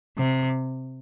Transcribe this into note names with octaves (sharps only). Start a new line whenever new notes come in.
C3